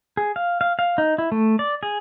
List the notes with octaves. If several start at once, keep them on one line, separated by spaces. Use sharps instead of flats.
G#4
F5
F5
F5
D#4
E4
A3
D5
G#4